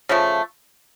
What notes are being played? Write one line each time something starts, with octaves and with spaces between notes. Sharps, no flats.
C#3 F3 A3